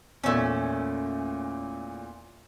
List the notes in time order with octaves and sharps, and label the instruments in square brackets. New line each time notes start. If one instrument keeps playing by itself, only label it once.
[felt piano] E2 A#2 [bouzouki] A3 C#4